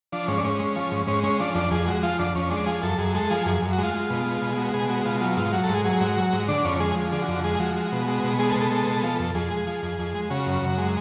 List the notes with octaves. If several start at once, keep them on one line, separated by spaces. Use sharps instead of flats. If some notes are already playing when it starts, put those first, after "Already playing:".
F3 D4
G#2 C#4
D4
G#2 C#4
G#3
F3
G#2
G#2 C#4
G#3 C#4
F3 D4
F2 D4
F2 G#4
G#3 F#4
F3 F4
F2 D4
F2 C#4
G#3 D4
F3 G#4
F#2 A4
F#2 G#4
G#3 A4
F3 G#4
F#2 G#4
F#2
F#4
G#3 F4
G#3
B2
G#3
B2
G#4
G#3 F#4
B2 G#4
G#3 F#4
B2 F4
F#3 F4
G#2 F4
F#3 F#4
A4
G#2
G#4
F#3 G#4
G#2 F#4
F#3
G#2
D3 D4
F2 C#4
G#3 G#4
F3
D3 G#4
F#4
F2
F#4
G#3 G#4
F3 F#4
G#3
B2
G#3
B2
G#3 G#4
A4
B2
A4
G#3
B2
F3
F2
F2 G#4
G#3
F3
F2
F2
G#3
C#3 F#4
F#2
F#2
G#3